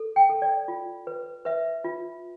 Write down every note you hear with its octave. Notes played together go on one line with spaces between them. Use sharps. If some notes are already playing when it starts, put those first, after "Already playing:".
Already playing: A4
G5
A4
D5
F4
B4
B4 E5
F4